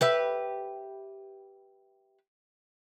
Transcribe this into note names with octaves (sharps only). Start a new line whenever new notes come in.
G4 B4 E5